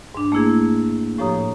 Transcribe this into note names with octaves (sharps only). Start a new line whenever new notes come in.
G#2 D4
A3 A#3 E4 G#4
A2 F3 G4 C#5 A#5 D#6